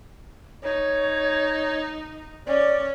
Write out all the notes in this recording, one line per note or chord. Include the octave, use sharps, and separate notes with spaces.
D#4 C#5
C#4 D5